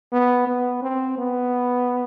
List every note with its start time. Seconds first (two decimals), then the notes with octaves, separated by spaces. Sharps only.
0.13 B3
0.47 B3
0.83 C4
1.18 B3